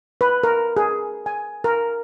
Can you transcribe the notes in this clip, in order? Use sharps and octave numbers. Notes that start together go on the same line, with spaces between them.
B4
A#4
G#4
G#5
A#4